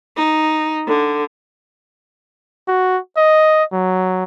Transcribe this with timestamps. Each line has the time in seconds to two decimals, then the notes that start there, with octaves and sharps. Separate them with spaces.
0.17 D#4
0.87 D3
2.68 F#4
3.17 D#5
3.73 F#3